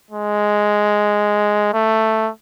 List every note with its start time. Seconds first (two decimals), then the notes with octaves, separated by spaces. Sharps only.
0.11 G#3
1.74 A3